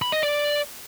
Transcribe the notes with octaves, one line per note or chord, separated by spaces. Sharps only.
B5
D#5
D5